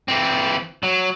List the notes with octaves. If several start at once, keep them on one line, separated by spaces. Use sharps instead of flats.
E3 C4
F#3